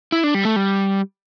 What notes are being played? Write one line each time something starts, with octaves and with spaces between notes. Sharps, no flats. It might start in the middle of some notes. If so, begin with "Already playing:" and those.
E4
D4
G3
A3
G3